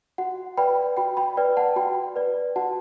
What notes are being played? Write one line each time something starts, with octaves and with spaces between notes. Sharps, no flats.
F#4 F#5
B4 D5 G5 B5
F#4 G5 B5
G5 B5
B4 D5 G5
F#5 A5
F#4 G5 B5
B4 D5
F#4 F#5 A5